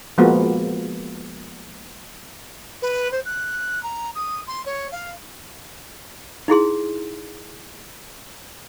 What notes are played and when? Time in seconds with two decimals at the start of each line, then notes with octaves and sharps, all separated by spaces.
0.18 F3 G#3 A#3 B3 F4 F#4
2.82 B4
3.11 C5
3.25 F#6
3.83 A#5
4.15 D#6
4.47 C6
4.65 C#5
4.91 F5
6.48 D#4 E4 G#4 C6